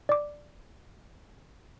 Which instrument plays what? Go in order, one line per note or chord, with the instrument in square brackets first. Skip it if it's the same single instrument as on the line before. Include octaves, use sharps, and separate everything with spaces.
[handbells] D5 D6